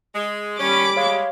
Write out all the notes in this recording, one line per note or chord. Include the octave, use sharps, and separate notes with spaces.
G#3
G3 C#4 B5 D6
G#3 C#5 F5 G#6